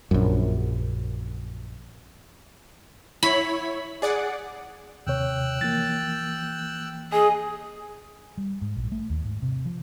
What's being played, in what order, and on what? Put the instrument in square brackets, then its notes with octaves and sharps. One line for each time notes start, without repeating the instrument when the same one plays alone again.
[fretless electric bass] A#1 F#2
[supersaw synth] E4 C#5 [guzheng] B5
[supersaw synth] G#4 D5 F#5
[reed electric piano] D#2 C3 C#5 [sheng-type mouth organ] G5 E6 F#6
[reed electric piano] E3 F3 A#3 [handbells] A6
[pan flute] G#4 [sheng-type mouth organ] D#5 [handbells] G#5
[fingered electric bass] G3
G#2
A#1
A3
D#2
G#2
C3
F3